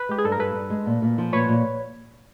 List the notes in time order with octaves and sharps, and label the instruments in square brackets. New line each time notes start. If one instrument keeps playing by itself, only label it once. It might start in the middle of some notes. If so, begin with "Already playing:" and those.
Already playing: [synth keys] B4
[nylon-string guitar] G#3 [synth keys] G4
[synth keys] G#4
[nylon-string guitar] G2 [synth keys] A4
[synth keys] A#4
[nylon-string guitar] G2 [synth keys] A4 B4
[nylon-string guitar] G2
G#3
A#2
A#2
F3
[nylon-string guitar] A#2 [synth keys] B4 C#5
[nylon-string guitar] A#2